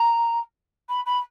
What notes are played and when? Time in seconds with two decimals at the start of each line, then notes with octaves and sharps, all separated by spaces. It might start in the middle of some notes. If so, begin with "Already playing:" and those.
Already playing: A#5
0.89 B5
1.06 B5